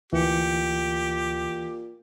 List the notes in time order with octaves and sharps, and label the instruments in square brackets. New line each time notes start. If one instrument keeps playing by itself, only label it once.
[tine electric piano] D2 C#7 [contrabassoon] A#2 [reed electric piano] E3 [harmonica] G4